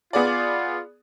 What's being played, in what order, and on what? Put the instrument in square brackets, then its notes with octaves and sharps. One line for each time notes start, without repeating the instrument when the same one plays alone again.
[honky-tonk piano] B3 G#4 D5 [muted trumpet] F4